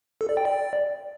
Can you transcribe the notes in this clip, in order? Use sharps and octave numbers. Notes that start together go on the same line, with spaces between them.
A4
D5
G5
D5